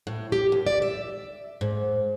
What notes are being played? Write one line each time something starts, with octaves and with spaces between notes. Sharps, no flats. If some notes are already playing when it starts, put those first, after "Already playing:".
A2
G4
D#2
D5
E5
G#2